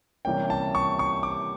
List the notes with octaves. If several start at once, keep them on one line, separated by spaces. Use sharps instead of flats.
C3 E3 G3 A#3 C#4 G5
A5
C#6
C#6
D6